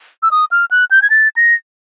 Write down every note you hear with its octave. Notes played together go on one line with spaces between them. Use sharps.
E6
D#6
F6
F#6
G6
G#6
A6
A#6